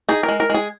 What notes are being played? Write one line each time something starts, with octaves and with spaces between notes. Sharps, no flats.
D#4 G#4
A#4
G#3
A#4
G#3 G#4